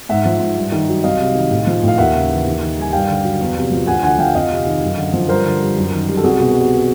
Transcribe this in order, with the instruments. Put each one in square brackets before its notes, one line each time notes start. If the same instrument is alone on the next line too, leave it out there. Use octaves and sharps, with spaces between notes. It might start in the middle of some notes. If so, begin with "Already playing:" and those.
[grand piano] G#2 E5 F#5
F3
G#2
G2
D#3
F#3
C2 D#5 F5
C3
D#3
A2
F3
A2 F5
D#2 E5 F#5
C#3
E3
D#2
D#3
G3 G#5
G2 F5 G5
D3
F#3
E2
C3
F3
D2 F#5 G#5
D3 F#5 G#5
F3 F5 G5
F2 D#5 F5
C3
D#3
F#2
D3
F3
G2 A#4 C5
D3
G3
F#2
D#3
G3
A4
C2 F#4 G#4
B2
G3